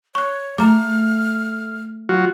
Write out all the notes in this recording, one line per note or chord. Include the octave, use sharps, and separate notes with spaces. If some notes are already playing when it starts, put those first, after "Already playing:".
C#5 C#6 F#6
A3 A#5 D6 F6
F#3 F4 F#4